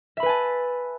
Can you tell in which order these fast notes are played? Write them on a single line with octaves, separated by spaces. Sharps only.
E5 B5 B4 G#5 A5